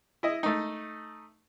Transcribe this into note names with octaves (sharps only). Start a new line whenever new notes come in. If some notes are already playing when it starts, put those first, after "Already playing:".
E4 D#5
A3 D#4